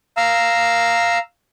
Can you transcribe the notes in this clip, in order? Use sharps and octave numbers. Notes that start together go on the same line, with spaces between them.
F5 A#5 E6